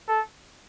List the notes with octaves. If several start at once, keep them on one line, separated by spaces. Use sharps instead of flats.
A4